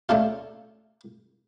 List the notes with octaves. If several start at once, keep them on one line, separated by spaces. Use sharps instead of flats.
A3 C#4 D4 F4